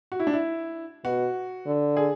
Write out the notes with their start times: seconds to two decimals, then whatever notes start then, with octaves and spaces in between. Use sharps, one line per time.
0.12 F#4
0.20 E4
0.27 D4
0.33 E4
1.04 B2 F#4
1.67 D3
1.97 G#4